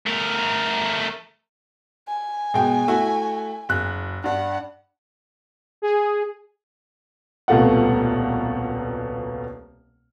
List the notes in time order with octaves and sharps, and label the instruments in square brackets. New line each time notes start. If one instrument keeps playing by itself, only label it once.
[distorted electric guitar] A3 A#4
[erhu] G#5
[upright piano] B2 G#3 G5
A3 E4 F#4
F#1 F#6
[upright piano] G2 D4 [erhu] F#5
[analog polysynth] G#4
[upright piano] D#1 C2 B2 A3 F4 F#5